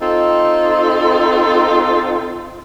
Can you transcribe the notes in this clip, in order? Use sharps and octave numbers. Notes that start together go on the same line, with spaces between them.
C4 D#4 F4 A4